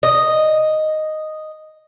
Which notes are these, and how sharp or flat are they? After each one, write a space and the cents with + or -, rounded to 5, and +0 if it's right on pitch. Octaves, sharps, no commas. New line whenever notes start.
D#5 -5